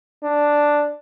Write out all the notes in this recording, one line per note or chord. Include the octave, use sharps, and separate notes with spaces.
D4